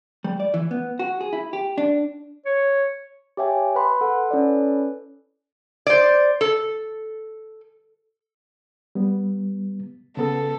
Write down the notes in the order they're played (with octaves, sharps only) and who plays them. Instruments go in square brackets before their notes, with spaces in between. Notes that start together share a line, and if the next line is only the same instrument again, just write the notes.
[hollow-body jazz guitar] G3
D5
E3
B3
F#4
G#4
E4
G4
D4
[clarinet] C#5
[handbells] G4 C#5 E5 G5 G#5
B4 B5 C6
A4 F#5
C#4 E4 A4 B4 C#5 D5
[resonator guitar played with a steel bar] C5 D5
A4
[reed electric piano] G3 B3
[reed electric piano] C#3 B3 [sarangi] A4